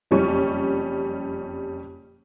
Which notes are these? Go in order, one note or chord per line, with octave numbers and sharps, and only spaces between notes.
F#1 F2 G3 C#4 C#6